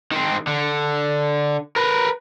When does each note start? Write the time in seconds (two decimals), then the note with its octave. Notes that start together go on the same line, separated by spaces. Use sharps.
0.12 D#3 C4
0.47 D3
1.76 A#4 B4